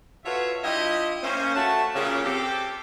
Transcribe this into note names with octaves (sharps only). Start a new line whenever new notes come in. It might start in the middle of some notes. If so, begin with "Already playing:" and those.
F4 F#4 A4 B4 C#5 E5
G3 D4 E4 F4 D#5
A#3 C#4 C5
A3 F#4 A5
A#2 C#3 G3
C4 G4 A4